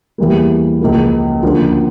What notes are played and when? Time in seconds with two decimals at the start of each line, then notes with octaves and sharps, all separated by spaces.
0.18 E2 E3 G3 A#3
0.81 C#2 C#3 F3 A#3
1.43 D2 C#3 F3 A#3 D4